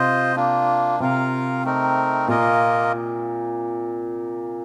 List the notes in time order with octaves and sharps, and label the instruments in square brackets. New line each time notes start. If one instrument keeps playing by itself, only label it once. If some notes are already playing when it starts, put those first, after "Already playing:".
Already playing: [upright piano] C3 [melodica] F4 C5 D#5
[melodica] A#3 D4 F4
[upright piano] C3 [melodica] F4 A#4 F5
[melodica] A3 C4 D#4 A#4
[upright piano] A#2 [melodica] A#3 F4 A#4 D#5